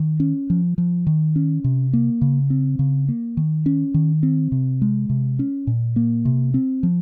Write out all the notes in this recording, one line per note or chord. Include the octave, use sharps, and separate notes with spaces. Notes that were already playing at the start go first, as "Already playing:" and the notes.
Already playing: D#3
C#4
F3
F3
D#3
C#4
C3
A#3
C#3
C4
C#3
A#3
D#3
C#4
D#3
C4
C3
G#3
C3
C#4
A#2
A#3
C3
C4
F3